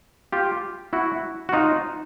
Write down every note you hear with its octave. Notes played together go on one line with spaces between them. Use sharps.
F4 G4
E4 F#4
F#4
D#4 F4